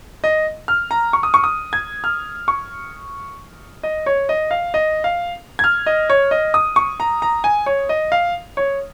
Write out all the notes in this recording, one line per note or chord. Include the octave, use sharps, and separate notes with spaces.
D#5
F6
A#5
C#6
D#6
C#6
D#6
G#6
F6
C#6
D#5
C#5
D#5
F5
D#5
F5
G#6
F6
D#5
C#5
D#5
D#6
C#6
A#5
A#5
G#5
C#5
D#5
F5
C#5